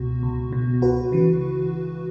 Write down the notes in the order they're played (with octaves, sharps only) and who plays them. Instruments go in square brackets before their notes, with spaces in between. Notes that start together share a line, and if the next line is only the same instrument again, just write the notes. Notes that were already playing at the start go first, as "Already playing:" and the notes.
Already playing: [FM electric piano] C#2 B2 F#4
C#2
B2
C#2 F#4 B4
C#3 E3